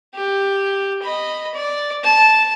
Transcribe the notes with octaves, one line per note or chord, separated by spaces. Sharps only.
G4
D#5 B5
D5
A5